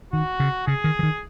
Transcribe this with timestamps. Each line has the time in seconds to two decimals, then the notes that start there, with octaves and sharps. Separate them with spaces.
0.13 D#3 F#4
0.40 C#3
0.67 C#3 G#4
0.84 D#3
0.99 E3
1.03 D#3